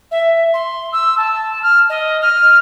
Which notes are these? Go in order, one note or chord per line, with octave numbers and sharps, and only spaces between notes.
E5
C6
E6
A5
F6
D#5
F6